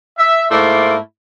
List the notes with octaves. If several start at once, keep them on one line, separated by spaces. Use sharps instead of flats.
E5
G#2 A3 A#3 E4 D5 C6